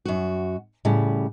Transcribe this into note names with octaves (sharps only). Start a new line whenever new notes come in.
F#2 F#4
A2 C#3 G3